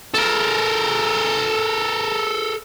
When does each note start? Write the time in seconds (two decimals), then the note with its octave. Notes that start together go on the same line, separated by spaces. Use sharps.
0.14 A4 A#4